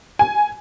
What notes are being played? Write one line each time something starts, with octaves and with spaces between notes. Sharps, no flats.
G#5